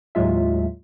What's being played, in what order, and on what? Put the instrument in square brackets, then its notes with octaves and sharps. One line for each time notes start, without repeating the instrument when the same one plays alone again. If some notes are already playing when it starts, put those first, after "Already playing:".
[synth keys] D#2 A2 F#3 G#3 F4 E5